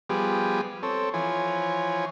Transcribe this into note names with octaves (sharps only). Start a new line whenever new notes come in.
F3 G3 B3 G4 G#4
C4 A4 C#5
E3 F3 C#5 G#5